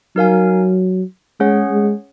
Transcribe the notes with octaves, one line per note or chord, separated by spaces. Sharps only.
F#3 D#4 A#4 F5 G#5
G#3 C#4 G#4 C#5 F#5
G#3